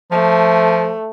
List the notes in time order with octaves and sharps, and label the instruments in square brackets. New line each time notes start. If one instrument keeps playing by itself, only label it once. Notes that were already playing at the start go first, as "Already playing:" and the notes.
[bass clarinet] F3 [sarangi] A3